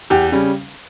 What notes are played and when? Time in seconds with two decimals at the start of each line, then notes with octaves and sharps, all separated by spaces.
0.10 E2 G4
0.31 C#3 G3 C#4